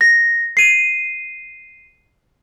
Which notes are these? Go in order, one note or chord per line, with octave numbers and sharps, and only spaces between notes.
A#6
C7 D#7